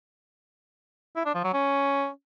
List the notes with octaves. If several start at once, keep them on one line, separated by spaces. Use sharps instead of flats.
E4
D4
F3
F#3
C#4